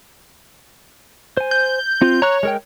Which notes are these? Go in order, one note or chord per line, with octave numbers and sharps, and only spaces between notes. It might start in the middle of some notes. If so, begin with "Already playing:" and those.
C5 G#5
G6
C4 F4
C#5 A#5 C#6 F#6
G#3 A#4 G5